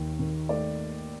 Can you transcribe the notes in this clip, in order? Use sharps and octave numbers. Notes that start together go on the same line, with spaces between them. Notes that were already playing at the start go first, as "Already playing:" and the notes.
Already playing: D#2 D#3
D#3
A3 D5